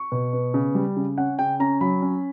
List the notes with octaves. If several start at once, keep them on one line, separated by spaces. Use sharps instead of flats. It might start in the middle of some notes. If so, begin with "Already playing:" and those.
Already playing: C#6
B2
B3
C#3
G3
C#3
C#4 F#5
C#3 G5
C#4 A#5
F#3 B5
C#4